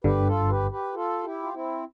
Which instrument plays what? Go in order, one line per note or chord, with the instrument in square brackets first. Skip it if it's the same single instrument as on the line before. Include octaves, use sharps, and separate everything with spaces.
[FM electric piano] G1 G2 D3 [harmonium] G4 B4
[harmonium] F4 A4
G4 B4
G4 B4
F4 A4
E4 G4
F4
C4 E4